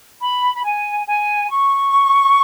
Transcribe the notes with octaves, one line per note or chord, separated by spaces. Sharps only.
B5
B5
G#5
G#5
C#6